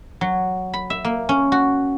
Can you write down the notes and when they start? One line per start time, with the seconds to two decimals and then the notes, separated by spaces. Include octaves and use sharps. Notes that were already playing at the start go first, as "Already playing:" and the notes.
0.21 F#3
0.73 B5
0.90 E5
1.05 A#3
1.29 C#4
1.52 F#4